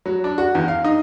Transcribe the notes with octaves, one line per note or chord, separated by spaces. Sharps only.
F#3
D4
F#4
E2
F5
D#4